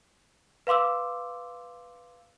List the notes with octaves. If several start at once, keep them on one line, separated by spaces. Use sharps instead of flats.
B4 F5 C6 D6 E6